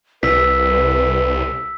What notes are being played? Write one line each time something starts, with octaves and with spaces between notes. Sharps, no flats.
C2 B4 E6 B6